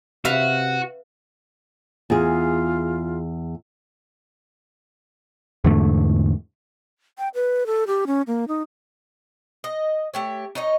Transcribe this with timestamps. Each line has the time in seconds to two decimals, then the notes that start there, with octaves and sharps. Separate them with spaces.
0.25 C3 F#4 B4 E5 F5
2.10 E2 F4 G#4
5.64 E2 G#2 D3 A3
7.18 G5
7.35 B4
7.67 A4
7.87 G4
8.07 C#4
8.27 A#3
8.48 D#4
9.64 D#5
10.14 A3 G4 C#5
10.55 D#4 C#5 D#5